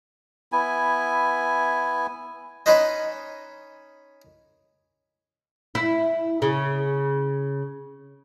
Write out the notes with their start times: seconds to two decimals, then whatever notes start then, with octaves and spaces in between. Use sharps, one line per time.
0.52 B3 E4 G#5
2.66 C#4 D#4 B4 C5 D#5
5.75 E4
6.42 C#3